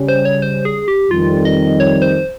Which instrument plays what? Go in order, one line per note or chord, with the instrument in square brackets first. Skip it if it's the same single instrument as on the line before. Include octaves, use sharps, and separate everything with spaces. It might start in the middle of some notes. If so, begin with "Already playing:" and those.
Already playing: [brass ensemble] C#3 G3 C#4
[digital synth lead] C5
C#5
C5
G#4
G4
[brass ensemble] F2 D#3 G3 [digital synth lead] F4
[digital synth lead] D#5
C#5
C5